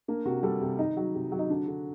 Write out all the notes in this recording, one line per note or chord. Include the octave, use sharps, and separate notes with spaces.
A#3 D4
C3 F#4
G3 A4
C3
D#3 D#4
F#3
C3
F#3
D#4
D3 D4
D3